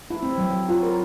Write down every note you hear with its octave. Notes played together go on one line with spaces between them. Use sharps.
E4
C4
F#3
F#3
F4
A#4